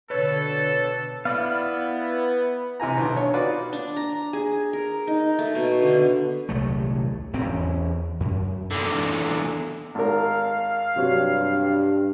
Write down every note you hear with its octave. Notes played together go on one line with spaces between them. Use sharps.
B2 D3 A4 B4 C#5
B3 E4 D5 F5
C3 E3 G#5 A#5
B1 D3
C#5
D#4 F4 F#4 B4 D5
D4
A#5
G#4
A#4
D#4
A3
B2
D3
D#1 C2 F#3 A3
G#1 D#3 C4
E2 C#4
F#2
E2 D3
G#1 A#4 F5
G2 C3 F#3